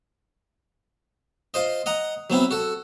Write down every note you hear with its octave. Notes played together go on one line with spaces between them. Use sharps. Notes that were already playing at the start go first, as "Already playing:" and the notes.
F4 C5 D#5
D#5 F#5 A#5
F#3 B3 C4 E4
F#4 A4